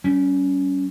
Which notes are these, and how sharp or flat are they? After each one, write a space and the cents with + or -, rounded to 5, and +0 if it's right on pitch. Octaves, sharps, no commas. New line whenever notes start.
G3 -30 C#4 +15